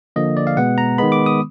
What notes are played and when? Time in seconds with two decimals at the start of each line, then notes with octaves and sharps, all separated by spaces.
0.16 D3 F3 A#3 D#5
0.37 D5
0.47 F5
0.57 B2 G#3 B3 F#5
0.78 A#5
0.98 D#3 G#3 B3 B5
1.12 D6
1.26 D#6